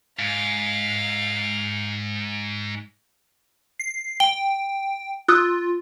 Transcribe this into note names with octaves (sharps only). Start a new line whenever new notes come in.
G#2 F5
C7
G5 G7
F4 D#6 E6 F#6